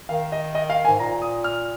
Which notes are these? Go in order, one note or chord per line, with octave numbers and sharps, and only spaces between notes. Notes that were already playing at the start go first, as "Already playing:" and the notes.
D#3 F5
D#5
D#5
F5
G#5
G#2
A#2 A#5
D#6
F6